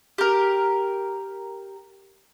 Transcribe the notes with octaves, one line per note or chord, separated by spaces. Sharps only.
G4 A#4